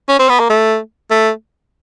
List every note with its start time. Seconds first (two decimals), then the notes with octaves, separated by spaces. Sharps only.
0.09 C#4
0.19 C4
0.29 B3
0.40 A#3
0.50 A3
1.11 A3